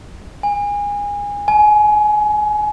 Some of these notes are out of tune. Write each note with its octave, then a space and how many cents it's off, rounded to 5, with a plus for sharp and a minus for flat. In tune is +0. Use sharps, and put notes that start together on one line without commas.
G#5 -25
G#5 +25